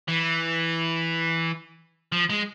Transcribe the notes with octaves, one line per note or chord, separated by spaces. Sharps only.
E3
F3
G#3